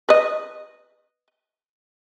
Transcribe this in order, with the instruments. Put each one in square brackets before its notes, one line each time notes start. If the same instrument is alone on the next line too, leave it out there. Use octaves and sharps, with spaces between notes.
[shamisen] B4 D#5